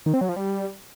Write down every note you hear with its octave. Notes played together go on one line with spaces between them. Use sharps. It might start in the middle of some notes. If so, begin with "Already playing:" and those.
D#3
C4
F#3
F3
G3